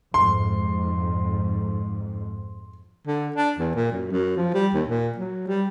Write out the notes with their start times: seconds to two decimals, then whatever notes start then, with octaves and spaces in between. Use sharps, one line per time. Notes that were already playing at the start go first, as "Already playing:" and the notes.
0.14 F2 G#2 C6
3.07 D3
3.36 D4
3.59 E2
3.75 A#2
3.92 F#2
4.11 F#2
4.37 F3
4.54 G3
4.74 D#2
4.89 A#2
5.18 F#3
5.48 G3